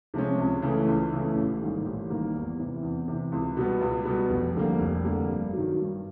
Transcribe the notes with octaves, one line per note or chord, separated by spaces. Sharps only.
C3 F3 G#3 C#4
C#2
C#3 E3 A3
C#2
C#3 E3 A3
A1
G#2 D#3 G3 A#3
A1
G#2 D#3 G3 A#3
E2
C3 E3
E2
C3 E3
C#2
B2 G3 B3
C#2
B2 G3 B3
F1
F2 D3 G3 A#3
F1
F2 D3 G3 A#3
G2
D#3 F#3
G2